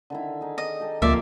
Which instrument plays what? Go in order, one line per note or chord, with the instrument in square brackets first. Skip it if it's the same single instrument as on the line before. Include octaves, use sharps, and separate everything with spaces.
[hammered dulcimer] D3 D#3 E4
D#4 G#4
[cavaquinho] D#5
[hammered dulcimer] G4 A4
[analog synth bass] D2 [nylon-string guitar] C3 F3 A#3 [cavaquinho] D5 E5